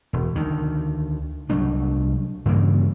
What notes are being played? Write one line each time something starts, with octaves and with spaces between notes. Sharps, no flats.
E1
D2 D#3
C2 F#3 A3 D4
G2 C#3 E3 A#3